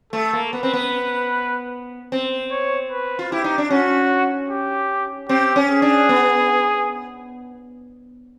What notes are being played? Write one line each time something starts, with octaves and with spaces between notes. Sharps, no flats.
A3 A4
A#3
B3 B4
C4
B3
C4
C#5
B4
F4
E4 G4
D#4
D4
C#4 F#4
G4
C4 G4
C#4
G#4
D4
B3